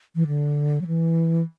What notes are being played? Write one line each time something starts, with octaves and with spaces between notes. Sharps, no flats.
E3
D3
F#3
E3